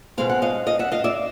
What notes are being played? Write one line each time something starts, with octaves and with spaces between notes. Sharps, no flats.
B2 G#3 C4 F5
F#5
D#5 F5
D#5 F5
E5 F#5
D#5 F5
D5 E5